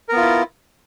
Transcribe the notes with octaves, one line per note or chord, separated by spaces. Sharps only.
B3 E4 F4 A#4